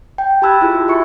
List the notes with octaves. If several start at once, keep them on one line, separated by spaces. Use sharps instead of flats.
G5
G4 A5 B5 E6 F#6 G#6
E4 F4 G#4
F#4
G#4 E5 C#6 C#7